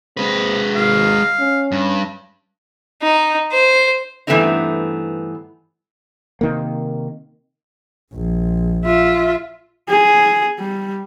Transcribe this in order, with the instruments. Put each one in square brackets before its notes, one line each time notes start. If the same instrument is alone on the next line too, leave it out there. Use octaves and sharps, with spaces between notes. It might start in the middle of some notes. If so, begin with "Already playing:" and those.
[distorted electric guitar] G#3 B4 [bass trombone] C4
[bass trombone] G#1 [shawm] F5
[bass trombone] C#4
[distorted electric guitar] G2
[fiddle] D#4
C5
[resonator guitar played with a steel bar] G2 E3 A3 B3 C4 D#4
[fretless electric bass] C3 D#3 A#3
[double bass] A#1
[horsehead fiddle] F4 E5
G#4
G3